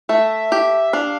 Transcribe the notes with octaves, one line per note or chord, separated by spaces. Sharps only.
A3 E5
G4
D4 F5